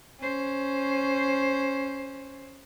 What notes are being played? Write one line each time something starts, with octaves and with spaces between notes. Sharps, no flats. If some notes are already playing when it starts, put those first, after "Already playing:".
C#4 C5